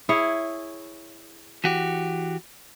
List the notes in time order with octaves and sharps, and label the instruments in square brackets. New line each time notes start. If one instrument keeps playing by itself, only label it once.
[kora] E4 G#4 C#5
[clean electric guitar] E3 F#4 G4